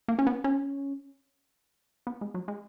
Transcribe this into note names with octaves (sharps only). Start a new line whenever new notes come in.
A#3
C#4
B3
C#4
B3
G#3
F#3
G#3